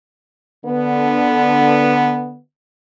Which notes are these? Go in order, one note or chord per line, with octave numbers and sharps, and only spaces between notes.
D3 B3